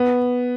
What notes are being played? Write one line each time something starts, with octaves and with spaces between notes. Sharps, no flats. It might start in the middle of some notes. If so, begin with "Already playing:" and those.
Already playing: B3